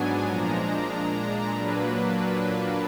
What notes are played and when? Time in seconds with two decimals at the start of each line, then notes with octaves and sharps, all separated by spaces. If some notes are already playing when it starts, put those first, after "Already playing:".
Already playing: G#2 F#3 B3 D4 G#5
0.24 A#2 F3 G#3 D4 A#5
0.88 A#2 G#3 D4
1.50 A#2 F#3 A#3 D4 B4